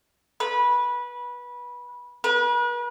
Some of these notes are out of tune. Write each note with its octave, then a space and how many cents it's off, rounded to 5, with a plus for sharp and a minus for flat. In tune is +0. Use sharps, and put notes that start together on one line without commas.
B4 -20
B4 -40